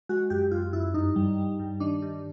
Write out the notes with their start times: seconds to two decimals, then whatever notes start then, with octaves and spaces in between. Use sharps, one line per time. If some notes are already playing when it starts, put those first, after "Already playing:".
0.09 G#3 F#4
0.30 F#2 G4
0.51 F#2 F4
0.73 F#2 E4
0.94 G2 D#4
1.16 G3
1.38 G3
1.59 G2
1.80 D#3 D4
2.02 G2